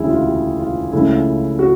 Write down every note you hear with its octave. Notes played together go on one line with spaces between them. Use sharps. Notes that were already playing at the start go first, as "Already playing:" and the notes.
Already playing: E1 D2 C#3 F#3 E4 G4 G#4
F4
G4
F4
C#2 C#3 F3 A3 E4
F#4